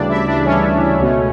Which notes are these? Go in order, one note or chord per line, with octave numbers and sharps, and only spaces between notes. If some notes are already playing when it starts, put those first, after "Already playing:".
Already playing: D2 C#3 E3 G3 D4 D5
E4 E5
D4 D5
C#4 C#5
C#2 B2 A3